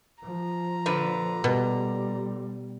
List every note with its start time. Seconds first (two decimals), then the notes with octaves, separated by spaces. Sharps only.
0.24 F3 A#5
0.86 A#2 D3 B4
1.44 B2 G3